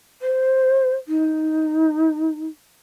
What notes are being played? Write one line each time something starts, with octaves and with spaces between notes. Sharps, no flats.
C5
D#4